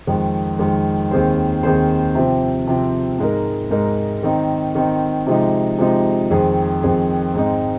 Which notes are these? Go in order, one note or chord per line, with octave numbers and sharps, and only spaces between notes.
F2 D#3 G#3
F2 D#3 G#3
D#2 D#3 C4 G#4 C5
D#2 D#3 C4 G#4 C5
C3 F3 C4
C3 F3 C4
G#2 G#3 D#4 A#4
G#2 G#3 D#4 A#4
D#3 C4 D#4
D#3 C4 D#4
C3 F3 G#3 D#4
C3 F3 G#3 D#4
F2 D#3 C4 G#4
F2 D#3 C4 G#4
G#2 G#3 C4 D#4